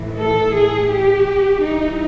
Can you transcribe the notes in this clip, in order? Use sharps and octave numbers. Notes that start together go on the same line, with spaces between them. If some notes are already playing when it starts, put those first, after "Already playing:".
Already playing: A2 E3
A4
G#4
G4
G2 E3 D#4